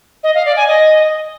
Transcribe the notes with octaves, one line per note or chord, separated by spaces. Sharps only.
D#5
F5
D5
G#5
D#5